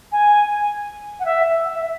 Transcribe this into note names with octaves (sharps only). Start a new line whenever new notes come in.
G#5
F#5
E5
E5